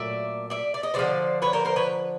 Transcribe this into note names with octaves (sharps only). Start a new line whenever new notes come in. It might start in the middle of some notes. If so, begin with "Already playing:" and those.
Already playing: A#2 F#3 A3 D5 E5
D5 E5
D5
D#5
D3 F3 G#3 C5 D5
B4 C#5
A#4 C5
A#4 C5
B4 C#5